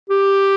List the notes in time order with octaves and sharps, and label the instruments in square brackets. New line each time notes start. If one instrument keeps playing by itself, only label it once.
[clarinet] G4